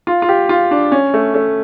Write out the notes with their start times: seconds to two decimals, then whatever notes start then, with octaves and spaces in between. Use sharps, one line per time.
0.07 F4
0.22 F4
0.29 G4
0.49 F4
0.71 D4
0.92 C#4
1.14 A3
1.34 A3